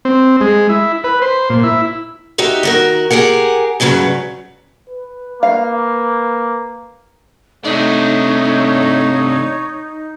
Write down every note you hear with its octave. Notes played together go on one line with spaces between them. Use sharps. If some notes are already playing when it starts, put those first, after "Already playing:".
C4
G#3
E4
B4
C5
A#2
E4
D#4 F#4 G4 E5
D#3 F#4 A#4
G4 G#4 A#4 F#5
D2 G2 C#3 F#3 B4
B4
A#3 F5
C3 A3 D4 D#4 C#5